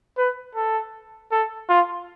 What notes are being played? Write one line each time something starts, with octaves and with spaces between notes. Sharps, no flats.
B4
A4
A4
F4